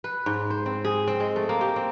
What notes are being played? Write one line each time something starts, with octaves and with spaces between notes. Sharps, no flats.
B4
G#2
C5
C4
G#4
C4
G#3
A3
A#3
G4
C4